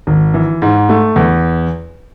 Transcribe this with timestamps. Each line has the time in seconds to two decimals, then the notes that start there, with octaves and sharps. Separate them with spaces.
0.07 G#1
0.34 E3
0.62 G#2
0.89 A3
1.16 E2